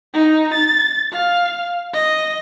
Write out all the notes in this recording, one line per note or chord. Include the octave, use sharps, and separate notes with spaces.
D#4
A6
F5
D#5